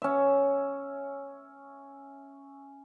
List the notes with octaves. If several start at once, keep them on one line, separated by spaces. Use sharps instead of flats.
C#4 E5